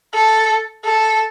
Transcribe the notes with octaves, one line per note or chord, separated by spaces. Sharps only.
A4
A4